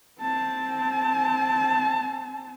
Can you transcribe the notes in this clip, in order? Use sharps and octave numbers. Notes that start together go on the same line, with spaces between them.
C4 A5